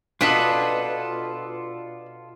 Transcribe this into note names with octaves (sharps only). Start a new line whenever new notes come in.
B2 D4 F4 A4 B4 D#5